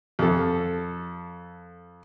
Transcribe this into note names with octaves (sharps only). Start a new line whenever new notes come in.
F2 A4